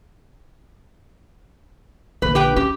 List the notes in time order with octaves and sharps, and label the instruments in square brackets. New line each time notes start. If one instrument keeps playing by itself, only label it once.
[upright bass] A#1 D3 [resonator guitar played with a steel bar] B4
[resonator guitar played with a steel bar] G4 B4 G5
[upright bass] C#4 [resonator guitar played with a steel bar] G4